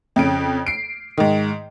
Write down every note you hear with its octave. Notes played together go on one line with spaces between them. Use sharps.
F2 C#3 D7
C7 D7
G#2 D#3